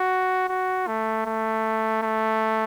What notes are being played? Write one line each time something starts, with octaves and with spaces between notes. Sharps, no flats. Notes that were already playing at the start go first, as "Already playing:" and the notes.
Already playing: F#4
F#4
A3
A3
A3